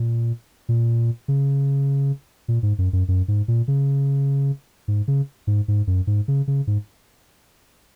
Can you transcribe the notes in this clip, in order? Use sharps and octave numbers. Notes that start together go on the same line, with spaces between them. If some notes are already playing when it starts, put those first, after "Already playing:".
Already playing: A#2
A#2
C#3
A#2
G#2
F#2
F#2
F#2
G#2
A#2
C#3
G#2
C#3
G#2
G#2
F#2
G#2
C#3
C#3
G#2